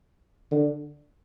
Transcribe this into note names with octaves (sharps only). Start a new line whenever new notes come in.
D3